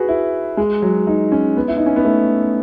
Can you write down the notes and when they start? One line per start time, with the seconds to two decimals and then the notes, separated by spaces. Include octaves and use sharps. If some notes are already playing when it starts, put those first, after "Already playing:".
Already playing: F#4 G#4 B4
0.08 E4
0.57 G#3
0.82 F#3
1.07 D#4
1.32 C#4
1.57 B3
1.68 E4
1.77 D#4
1.86 C#4
1.96 B3
2.05 A3